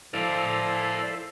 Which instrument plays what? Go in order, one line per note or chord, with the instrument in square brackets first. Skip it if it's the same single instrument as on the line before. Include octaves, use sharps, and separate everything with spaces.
[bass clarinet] F3 [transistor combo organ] E4 A4 C5 [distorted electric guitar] D5 F5